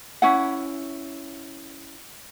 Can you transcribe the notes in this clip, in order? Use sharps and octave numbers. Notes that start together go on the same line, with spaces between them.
C#4 E4 F#5